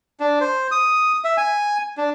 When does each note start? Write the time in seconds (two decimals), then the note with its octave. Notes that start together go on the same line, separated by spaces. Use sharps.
0.20 D4
0.41 C5
0.71 D#6
1.24 E5
1.37 G#5
1.97 D4